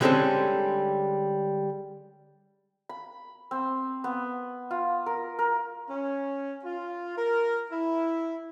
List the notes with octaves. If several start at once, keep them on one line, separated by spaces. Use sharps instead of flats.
D3 G3 G#3 C4 C#4 A4
B5
C4
B3
F4
A#4
A#4
C#4
F4
A#4
E4